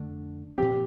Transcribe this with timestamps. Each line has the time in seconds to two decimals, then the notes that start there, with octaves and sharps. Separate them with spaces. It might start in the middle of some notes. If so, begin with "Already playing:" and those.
Already playing: F2 D3 A3 D4
0.58 A#2 F3 C4 G4